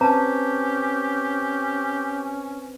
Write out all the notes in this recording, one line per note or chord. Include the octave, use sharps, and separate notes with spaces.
C4 C#4 G4 B4 C5 A5 A#5